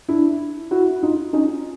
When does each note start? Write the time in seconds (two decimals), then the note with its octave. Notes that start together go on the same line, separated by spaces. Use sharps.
0.08 D4 E4
0.71 E4 F#4
1.03 D#4 F4
1.33 C#4 D#4